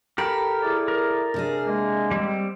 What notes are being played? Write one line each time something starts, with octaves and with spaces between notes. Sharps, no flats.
G4 A4 A#4 B5
E4 G#4 D5
A#4
C3 D4 G#4
G#3 A#3
G3 C4